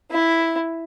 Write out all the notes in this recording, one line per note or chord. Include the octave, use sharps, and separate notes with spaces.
E4